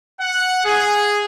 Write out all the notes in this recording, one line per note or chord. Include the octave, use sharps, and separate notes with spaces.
F#5
G#4